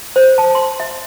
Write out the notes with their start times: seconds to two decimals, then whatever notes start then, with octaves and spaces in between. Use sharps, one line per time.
0.16 C5
0.38 A5
0.55 C6
0.80 E5